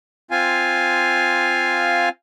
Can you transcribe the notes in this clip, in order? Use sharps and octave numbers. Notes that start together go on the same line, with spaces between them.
C4 F4 F5 G#5